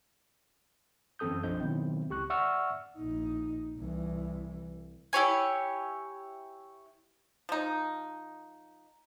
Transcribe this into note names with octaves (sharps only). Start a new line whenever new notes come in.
F#2 E3 C4 A4 D#6 G6
B1 F3 D4 C5 D#5 G6
B2 D#3 F#3 B3 C4 E4
C#2 G4 C#6 F#6
D5 E5 F#5 C#6 E6 F6
A#1 D#4
C2 E3
E4 G4 C#5 G#5
F3 D#4